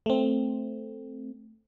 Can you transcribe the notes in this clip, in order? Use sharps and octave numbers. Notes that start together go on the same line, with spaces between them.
A3 C4